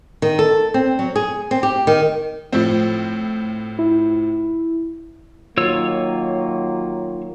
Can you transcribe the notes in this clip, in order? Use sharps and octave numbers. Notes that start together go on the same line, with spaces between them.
D#3
A4
C4
F#3
G#4
C4
G4
D#3
A2 F3 C4
E4
D#3 F#3 A#3 F4 C#5 E6